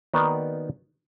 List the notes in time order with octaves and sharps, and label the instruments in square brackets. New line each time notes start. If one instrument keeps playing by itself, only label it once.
[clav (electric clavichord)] D#3 A#3 B3 D#4 F#4 D5